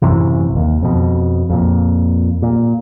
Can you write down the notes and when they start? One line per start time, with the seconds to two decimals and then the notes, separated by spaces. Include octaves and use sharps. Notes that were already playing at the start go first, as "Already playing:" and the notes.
0.02 A1 F#2 C3 E3
0.56 D#2
0.82 F2 B2
1.50 F2 A#2
2.42 A#2